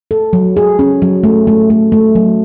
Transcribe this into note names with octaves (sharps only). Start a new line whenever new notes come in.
A4
F#3
G#4
C#4
F#3
A3
A3
A3
A3
F#3